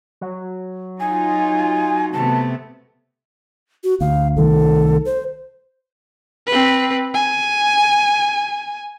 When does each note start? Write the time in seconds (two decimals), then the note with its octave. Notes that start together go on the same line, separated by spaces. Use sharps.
0.21 F#3
1.00 D#4 F4 G#5
2.13 C3 A3 B3 A5
3.84 F#4
4.01 D2 F5
4.37 C2 D#3 A3 A4
5.06 C5
6.47 C4 B4
7.14 G#5